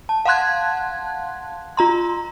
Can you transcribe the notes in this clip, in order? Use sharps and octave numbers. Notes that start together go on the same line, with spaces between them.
A5
F5 F#5 A5 C6 F#6 G#6
F4 A#5 C6